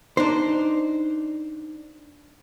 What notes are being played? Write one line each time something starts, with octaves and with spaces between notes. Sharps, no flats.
D4 D#4 C5